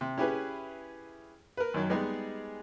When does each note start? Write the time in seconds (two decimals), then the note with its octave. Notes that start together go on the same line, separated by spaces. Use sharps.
0.01 C3
0.18 C#4 E4 G4 G#4 B4
1.57 A#4 B4
1.74 F#2 D#3 F#3
1.90 G3 G#3 B3 D#4 G#4